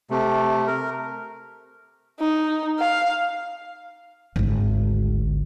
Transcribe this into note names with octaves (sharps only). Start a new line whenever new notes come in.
C3 A3
A#4
D#4
F5
G#1 D2